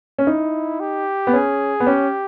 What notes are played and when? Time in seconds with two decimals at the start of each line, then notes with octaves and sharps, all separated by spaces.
0.18 C#4
0.27 D#4 E4
0.80 G4
1.27 B3
1.33 C#4 G#4
1.80 B3
1.87 C#4 G4